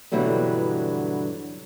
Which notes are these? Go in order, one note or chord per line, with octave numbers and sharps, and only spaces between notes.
G2 B2 D3 E3 F#3 G3